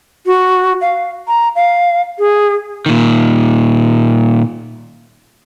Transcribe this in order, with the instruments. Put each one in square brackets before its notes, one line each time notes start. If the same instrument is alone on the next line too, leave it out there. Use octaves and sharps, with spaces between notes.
[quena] F#4
F5
A#5
F5
G#4
[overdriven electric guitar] A#2 D#3